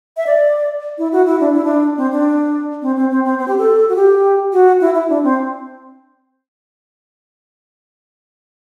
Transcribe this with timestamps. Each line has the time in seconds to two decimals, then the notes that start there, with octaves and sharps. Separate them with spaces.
0.17 E5
0.26 D5
0.98 E4
1.12 F#4
1.26 E4
1.40 D4
1.52 E4
1.64 D4
1.97 C4
2.11 D4
2.82 C4
2.96 C4
3.10 C4
3.25 C4
3.39 C4
3.48 G4
3.58 A4
3.89 F#4
3.96 G4
4.53 F#4
4.81 E4
4.94 E4
5.09 D4
5.23 C4